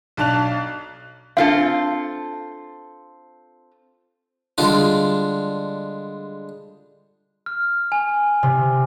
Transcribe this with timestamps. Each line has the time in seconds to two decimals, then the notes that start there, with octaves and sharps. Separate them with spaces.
0.17 B1 D4 A5 F#6 F7
1.37 C4 D4 F4 A4 F5
4.58 D3 G3 G#3 D4 F4
7.46 F6
7.92 G#5
8.43 C3